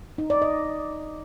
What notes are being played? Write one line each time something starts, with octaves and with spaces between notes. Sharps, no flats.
D#4
D5
D#5